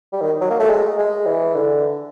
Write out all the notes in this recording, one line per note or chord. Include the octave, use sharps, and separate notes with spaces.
G3
D#3
F#3
A#3
A3
G#3
G#3
E3
D3